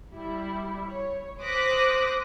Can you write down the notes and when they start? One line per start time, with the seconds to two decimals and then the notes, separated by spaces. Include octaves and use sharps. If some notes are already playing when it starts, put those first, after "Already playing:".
0.13 G3 E4
0.86 C#5
1.40 C5 D6 D#6 F#6 A#6 B6